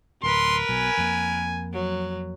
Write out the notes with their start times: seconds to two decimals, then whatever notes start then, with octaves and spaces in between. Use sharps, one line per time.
0.23 D1 A#4 B4 C6
0.69 B1 B2 G#5
0.98 F2 A#3
1.73 F#3